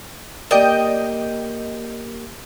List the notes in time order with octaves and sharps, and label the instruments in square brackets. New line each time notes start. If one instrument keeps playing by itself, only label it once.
[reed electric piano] A#3 G4 A#4 [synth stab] D5 G5 G6 [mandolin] D#5